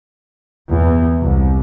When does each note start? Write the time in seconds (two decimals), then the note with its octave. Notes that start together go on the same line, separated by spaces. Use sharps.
0.71 E2
1.22 C2